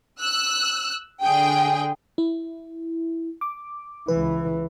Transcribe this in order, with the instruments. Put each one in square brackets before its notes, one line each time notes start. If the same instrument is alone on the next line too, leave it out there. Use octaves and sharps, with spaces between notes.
[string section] E6 F#6
D3 G#4 G5
[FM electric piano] E4
D6
[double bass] C#2 E3 [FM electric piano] B4